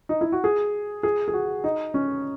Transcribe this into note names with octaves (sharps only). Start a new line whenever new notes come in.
D#4
E4
F#4
G#4
G#4
G#4
F#4
D#4
C#4